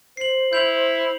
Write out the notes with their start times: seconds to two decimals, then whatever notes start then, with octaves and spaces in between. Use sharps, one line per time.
0.17 C5 C7 F#7
0.53 E4 G6 F7 F#7